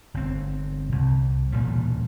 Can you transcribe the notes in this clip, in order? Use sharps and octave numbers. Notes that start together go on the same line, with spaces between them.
G1 C4
C2
E1 D2 A#2 G3